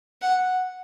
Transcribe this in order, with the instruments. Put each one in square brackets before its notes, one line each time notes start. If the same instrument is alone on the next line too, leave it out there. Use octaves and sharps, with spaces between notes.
[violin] F#5